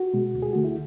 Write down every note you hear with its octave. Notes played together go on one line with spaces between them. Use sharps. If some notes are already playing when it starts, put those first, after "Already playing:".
Already playing: F#4
B2 G#3
D2
G#4
D3 A3 F#4
E4